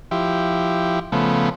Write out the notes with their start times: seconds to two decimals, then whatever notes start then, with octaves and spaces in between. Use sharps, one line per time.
0.11 F3 E4 G4
1.12 C#3 F3 A3 B3